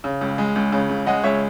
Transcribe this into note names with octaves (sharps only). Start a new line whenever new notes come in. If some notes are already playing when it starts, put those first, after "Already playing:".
C#3
C#2
G#3
C#2
C#3
C#2
G#3 D#5 F#5
C#2 C#5 E5